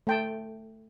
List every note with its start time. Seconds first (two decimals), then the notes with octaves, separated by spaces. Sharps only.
0.07 A3 G5 A5